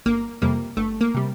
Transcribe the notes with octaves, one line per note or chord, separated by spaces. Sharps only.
G1 A#3
F2 C3 G3 A#3
G1 A3
A#3
C3 G3